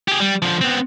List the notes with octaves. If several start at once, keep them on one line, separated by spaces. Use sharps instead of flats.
G4 G#4
G3
D3 F3
B3 C4